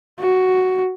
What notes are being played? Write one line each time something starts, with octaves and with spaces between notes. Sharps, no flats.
F#4